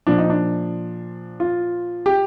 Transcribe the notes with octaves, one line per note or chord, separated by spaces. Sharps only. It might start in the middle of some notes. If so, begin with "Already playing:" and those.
A#2 F3 D4
D#4
D4
F4
G4